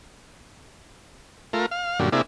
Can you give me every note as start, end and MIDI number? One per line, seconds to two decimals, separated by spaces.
1.53 1.66 57
1.53 1.66 65
1.53 1.66 70
1.71 1.99 77
1.99 2.09 42
1.99 2.09 46
1.99 2.09 50
1.99 2.09 55
2.12 2.22 48
2.12 2.22 58
2.12 2.22 62
2.12 2.22 64
2.12 2.22 68